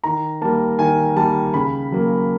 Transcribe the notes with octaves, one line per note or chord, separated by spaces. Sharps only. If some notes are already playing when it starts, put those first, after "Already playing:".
D#3 A#5
G3 A#3 A5
D#3 G#5
G3 A#3 A5
C#3 B5
F#3 A#3